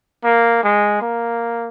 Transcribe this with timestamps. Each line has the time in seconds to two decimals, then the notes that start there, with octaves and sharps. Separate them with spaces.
0.24 A#3
0.63 G#3
1.02 A#3